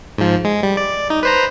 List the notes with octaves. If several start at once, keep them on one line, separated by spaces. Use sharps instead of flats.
G#2 F3
G#3
G3
D5
D#4
B4 C5 A#5